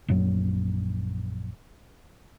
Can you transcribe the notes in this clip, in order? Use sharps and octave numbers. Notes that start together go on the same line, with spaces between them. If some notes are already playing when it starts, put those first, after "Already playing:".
A#1 F#2 F#3